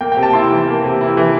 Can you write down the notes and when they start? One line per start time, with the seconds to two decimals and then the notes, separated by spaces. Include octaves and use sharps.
0.01 A#3 G5
0.12 C3 G5
0.23 A5
0.33 E4 C6
0.51 E3
0.67 A#3
0.83 C3
1.01 E4
1.17 E3